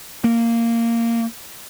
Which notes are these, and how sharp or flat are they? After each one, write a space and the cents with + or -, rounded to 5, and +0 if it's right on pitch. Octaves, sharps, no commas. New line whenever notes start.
A#3 -10